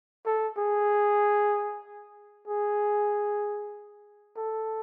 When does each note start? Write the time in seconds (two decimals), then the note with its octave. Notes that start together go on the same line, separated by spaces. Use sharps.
0.26 A4
0.58 G#4
2.48 G#4
4.38 A4